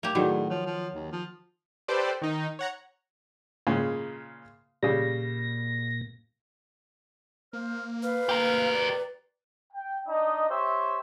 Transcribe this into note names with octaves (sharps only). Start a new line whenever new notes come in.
A#3 G4
A2 D#3 F#3 F#4 G#4 D5
F3 C#5
F3
D#2
F3
G4 A4 B4 C5 D5
D#3 D#4
C#5 F#5 A#5
A#2 C#3 G#3
A#2 C#3 G3 A#6
A#3 C5 F6
B4 F5 B5 F6
G4 A#4
D5
G5
D4 D#4 D#5
G4 C5 C#5 E5